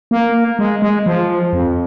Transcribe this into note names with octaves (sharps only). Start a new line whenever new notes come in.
A#3
G#3
G#3
F3
F2